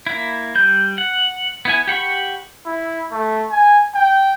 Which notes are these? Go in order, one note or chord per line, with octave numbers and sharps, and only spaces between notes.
A#3 E4
G3 G6
F#5
B3 E4 G#5
G4 F#5 B5 C#6
E4
A3
G#5
G5